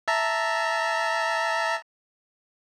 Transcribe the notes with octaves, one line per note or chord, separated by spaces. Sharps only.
E5 A5 A#5